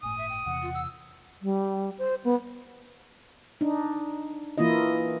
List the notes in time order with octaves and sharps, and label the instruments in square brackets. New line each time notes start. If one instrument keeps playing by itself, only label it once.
[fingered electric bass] G1 A2 [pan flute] G#5 [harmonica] D#6
[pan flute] E5
G5
[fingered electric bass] E1 E2 C3 [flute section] F#5
[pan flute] F4
E6
[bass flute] G3
C5
B3
[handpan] D4 D#4
E3 A#3 E4 F4 D#5